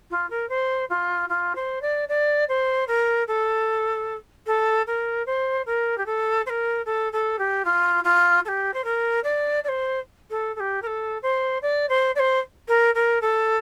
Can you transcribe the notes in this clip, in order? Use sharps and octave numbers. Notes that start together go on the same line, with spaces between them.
F4
A#4
C5
F4
F4
C5
D5
D5
C5
A#4
A4
A4
A#4
C5
A#4
G4
A4
C5
A#4
A4
A4
G4
F4
F4
A4
G4
C5
A#4
D5
D5
C5
A4
A4
G4
A#4
A4
C5
D5
C5
D5
C5
A#4
A#4
A4